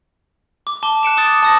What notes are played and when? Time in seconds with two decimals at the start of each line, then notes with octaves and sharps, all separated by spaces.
0.67 D6
0.83 A5 D6 G7
1.03 F#6 C#7 D7 E7
1.17 D6 D#6 F#6 A6
1.43 A5 D#6 A#6